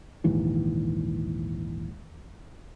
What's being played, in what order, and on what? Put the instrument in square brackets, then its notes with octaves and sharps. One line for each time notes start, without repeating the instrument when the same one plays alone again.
[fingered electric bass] A#1 D#2 G#2 E3